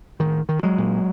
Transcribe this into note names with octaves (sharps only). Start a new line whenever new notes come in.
A2 D#3
D#3
F#3 G#3
A#2